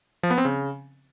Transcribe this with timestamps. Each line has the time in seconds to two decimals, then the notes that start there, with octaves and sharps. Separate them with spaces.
0.23 F3
0.31 B3
0.38 C4
0.45 C#3